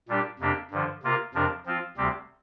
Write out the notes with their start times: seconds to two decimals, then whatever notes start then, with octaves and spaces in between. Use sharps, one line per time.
0.08 A#2 G3 D4 G4
0.39 F2 C3 A#3 D4 G4
0.71 G2 D3 F3
1.03 C3 A#3 F4 A#4
1.34 F2 C3 F3 D4 A#4
1.66 F3 C4 F4
1.97 D2 C3 G3 C4 G4